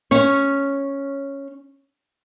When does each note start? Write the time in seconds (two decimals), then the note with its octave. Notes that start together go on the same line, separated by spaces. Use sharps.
0.11 C#4 C#5